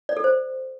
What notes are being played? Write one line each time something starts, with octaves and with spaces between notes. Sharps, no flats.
D5
A4
C5